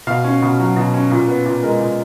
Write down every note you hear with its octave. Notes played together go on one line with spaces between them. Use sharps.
B2 F5
C#4
B2
F#3
B2
C#4
A#2
B3
A#2
G#3 A#4
A#2